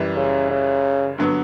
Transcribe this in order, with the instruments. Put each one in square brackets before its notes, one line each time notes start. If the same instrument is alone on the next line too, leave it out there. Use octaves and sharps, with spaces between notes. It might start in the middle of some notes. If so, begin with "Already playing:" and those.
Already playing: [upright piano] F#2 E3 G3
[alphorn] C#3
C#3
[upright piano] G2 D3 F#3 B3